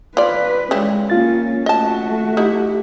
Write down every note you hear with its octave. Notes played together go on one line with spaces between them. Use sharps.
F4 B4 D5
C#3 G3 G#3 C#4 E4
A#3 C#4 F4 A6
A3 F#4 D#5 A5
D#4 E4 G4